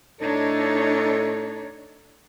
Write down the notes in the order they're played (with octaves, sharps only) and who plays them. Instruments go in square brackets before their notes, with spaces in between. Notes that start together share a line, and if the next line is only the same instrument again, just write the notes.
[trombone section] A2 A4 [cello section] D4 D#4 C#5